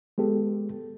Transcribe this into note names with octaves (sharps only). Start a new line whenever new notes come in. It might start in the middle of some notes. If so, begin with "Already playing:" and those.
G#3 B3 G4 A4